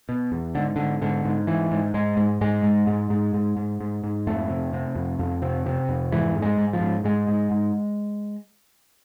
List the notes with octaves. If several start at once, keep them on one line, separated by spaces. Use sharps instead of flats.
B2
E2
G#2 D3
G#2 D3
G#2 D3
G#2
G#2 E3
G#2
G#2 G#3
G#2
G#2 G#3
G#2
G#2
G#2
G#2
G#2
G#2
G#2
F2 A3
C3
C3
F2
F2
C3
C3
F2
G#2 E3
G#2
G#3
G#2
F3
G#2
G#2 G#3
G#2
G#2